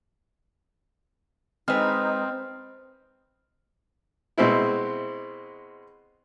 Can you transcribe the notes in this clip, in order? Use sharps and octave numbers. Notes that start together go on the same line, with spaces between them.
G#3 C4 D#4 B4 C5 D#5 F6
B2 G#3 C4 E4